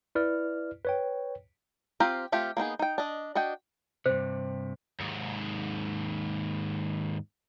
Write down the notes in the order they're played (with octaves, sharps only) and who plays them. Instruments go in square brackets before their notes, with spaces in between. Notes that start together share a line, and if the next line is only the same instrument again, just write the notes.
[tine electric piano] E4 B4 D5 F6
B4 C#5 G5
[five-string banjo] C4 F4 G4 F5 A#5
A3 C4 F4 G4
A#3 B3 D#4 G#4
D#4 G5
D4 D#5
D4 F#4 D#5 G5
[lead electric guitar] G2 C3 [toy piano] C5
[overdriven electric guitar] D#2 G#2